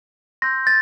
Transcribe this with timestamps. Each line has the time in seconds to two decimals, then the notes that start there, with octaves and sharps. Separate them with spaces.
0.42 C6 E6 G6 A#6
0.67 A6